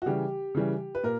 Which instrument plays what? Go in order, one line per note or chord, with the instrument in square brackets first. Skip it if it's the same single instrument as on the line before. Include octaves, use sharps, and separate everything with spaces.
[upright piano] F#4
C#3 E3 G3 G4
C#3 E3 G3
B4
A#2 A#4